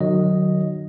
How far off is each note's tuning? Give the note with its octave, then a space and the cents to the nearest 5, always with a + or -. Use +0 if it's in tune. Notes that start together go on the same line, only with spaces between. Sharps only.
D#3 -45 F#3 +0 D#5 +0